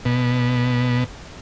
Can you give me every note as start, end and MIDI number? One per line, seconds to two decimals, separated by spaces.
0.05 1.04 47